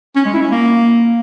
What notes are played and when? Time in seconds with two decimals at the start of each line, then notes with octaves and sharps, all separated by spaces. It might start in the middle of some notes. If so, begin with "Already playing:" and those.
0.16 C#4
0.25 G#3
0.34 E4
0.42 C#4
0.51 A#3